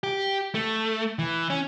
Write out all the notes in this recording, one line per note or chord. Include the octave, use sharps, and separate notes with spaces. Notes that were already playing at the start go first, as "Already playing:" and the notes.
G4
A3
E3
C#4